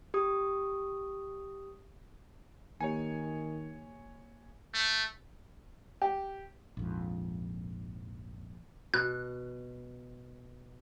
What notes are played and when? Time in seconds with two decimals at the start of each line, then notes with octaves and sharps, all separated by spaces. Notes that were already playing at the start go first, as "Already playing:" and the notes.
0.14 G4 D#6
2.81 D#3 A#3 G4 C#5 G#5
4.74 A3
6.02 G4
6.77 A#1 F2 G#2
8.94 B2 F#6